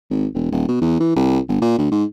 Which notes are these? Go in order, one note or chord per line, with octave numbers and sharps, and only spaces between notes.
G#1
E1
D#1
B2
E2
E3
C2
G1
A#2
D2
G#2